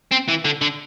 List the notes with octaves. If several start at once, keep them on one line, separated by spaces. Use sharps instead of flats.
C4
E3
D3
D3